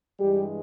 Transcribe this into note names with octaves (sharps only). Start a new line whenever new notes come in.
G2 E3 G3 G#3 G4